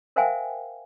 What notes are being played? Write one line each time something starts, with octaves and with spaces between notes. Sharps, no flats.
A#4 C5 E5 F5 G5 G#5